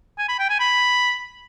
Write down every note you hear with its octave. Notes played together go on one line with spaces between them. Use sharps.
G#5
B5
G5
G#5
B5